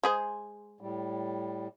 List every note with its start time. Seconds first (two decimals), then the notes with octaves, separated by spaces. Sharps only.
0.03 G#3 G#4 C5
0.81 A2 G3